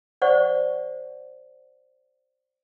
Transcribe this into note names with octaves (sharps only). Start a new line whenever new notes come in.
C5 D5 F#5 C#6